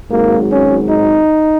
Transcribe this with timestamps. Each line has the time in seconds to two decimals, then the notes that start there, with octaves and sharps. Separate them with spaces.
0.11 G#1 G#2 F#3 A#3
0.51 C#4
0.89 D#4